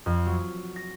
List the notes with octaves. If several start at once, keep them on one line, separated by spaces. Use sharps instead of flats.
F2
F#3
A#6